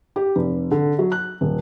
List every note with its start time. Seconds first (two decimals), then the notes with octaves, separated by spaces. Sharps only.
0.16 G4
0.36 F1
0.71 D3
0.99 F#3
1.12 F#6
1.41 D#1